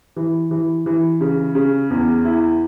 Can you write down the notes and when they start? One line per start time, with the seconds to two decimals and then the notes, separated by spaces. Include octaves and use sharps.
0.16 E3
0.51 E3
0.86 E3
1.21 C#3
1.55 C#3
1.90 E2
2.25 E4